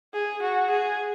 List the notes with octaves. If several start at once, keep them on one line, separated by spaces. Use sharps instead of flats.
G#4
F#4
G#4